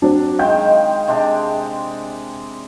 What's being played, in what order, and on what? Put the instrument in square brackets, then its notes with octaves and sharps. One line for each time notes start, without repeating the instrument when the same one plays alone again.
[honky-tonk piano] F#3 C4 D4
[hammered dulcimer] D#3 G#3 [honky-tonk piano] F5 G5 G6
[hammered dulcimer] C3 G#3 D4